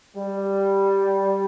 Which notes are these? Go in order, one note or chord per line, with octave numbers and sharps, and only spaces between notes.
G3